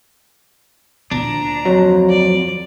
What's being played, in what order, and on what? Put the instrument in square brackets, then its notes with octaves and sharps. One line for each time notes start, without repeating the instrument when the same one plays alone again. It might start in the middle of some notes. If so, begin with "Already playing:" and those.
[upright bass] D2 A#2 [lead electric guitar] D4 [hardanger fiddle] A#5
[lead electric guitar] F2 [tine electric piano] F#3
[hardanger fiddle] D5